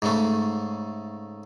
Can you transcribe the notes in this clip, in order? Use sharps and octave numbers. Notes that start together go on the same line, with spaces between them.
G#2 C#3 A3